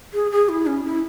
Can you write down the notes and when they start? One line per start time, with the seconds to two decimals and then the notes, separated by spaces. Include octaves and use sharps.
0.14 G#4
0.31 G#4
0.49 E4
0.67 C#4
0.84 E4